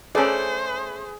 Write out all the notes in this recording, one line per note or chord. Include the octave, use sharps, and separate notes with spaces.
A3 C#4 G#4 A4 B4 C5 D5